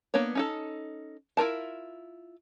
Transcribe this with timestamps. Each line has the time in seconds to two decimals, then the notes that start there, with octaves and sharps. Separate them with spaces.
0.14 A#3 B3 D4 C#5
0.35 C#4 D#4 A4
1.37 E4 F4 A#4 A5